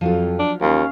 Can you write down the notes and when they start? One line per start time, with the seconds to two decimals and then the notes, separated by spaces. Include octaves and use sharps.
0.01 F2 F3 F#3 F4
0.39 D4
0.61 D#2 C#4 F5